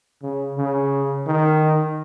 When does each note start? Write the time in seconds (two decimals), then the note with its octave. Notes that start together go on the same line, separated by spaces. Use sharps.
0.23 C#3
0.58 C#3
1.27 D#3